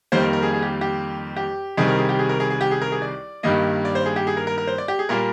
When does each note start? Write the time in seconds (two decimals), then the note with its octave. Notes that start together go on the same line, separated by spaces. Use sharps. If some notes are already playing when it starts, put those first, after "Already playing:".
0.12 F2 D#3 G3 A#3 C5
0.23 A#4
0.33 A#4
0.43 G#4
0.53 G#4
0.62 G4
0.81 G4
1.36 G4
1.77 C2 C3 D#3 G3 G#4
1.88 A#4
1.98 G#4
2.09 G4
2.19 G#4
2.29 A#4
2.40 G#4
2.50 G#4
2.61 G4
2.71 G#4
2.82 A#4
2.92 G#4
3.02 D5
3.43 G2 D#3 G3 A#3 D#5
3.85 D5
3.95 C5
4.06 G#4
4.16 G4
4.27 G#4
4.37 A#4
4.47 A#4
4.58 A#4
4.67 C5
4.78 D5
4.88 G4
4.99 G#4
5.09 A#2 G3 A#3 A#4